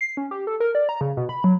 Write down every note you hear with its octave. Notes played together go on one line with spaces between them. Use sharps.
C7
C#4
G4
A4
A#4
D5
A#5
C#3
B2
B5
F#3